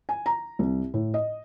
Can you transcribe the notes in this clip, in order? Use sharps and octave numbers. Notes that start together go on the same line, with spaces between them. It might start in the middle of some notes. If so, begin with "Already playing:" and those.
G#5
A#5
C2
A2
D#5